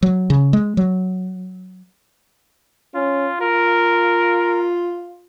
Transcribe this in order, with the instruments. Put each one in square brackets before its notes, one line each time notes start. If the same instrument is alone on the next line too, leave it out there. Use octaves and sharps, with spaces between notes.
[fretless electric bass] F#3
C#3
G#3
F#3
[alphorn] C#4 [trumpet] F4
[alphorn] F4 [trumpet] A#4